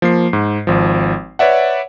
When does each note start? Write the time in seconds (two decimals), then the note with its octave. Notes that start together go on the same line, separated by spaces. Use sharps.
0.02 F3 A#3 C7
0.33 G#2
0.67 G#1 F3
1.39 B4 C#5 D5 E5 F#5